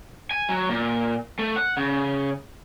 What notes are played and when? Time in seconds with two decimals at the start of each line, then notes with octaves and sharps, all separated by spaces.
0.31 G#5
0.49 F#3
0.69 A#2
1.39 A3
1.56 F#5
1.77 C#3